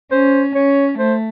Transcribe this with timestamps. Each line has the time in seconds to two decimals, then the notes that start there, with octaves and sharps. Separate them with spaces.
0.11 C#4 C5
0.55 C#4 C#5
0.99 A3 C5